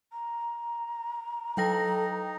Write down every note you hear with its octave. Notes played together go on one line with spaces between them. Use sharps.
A#5
F#3 D#4 A4 G5 A#6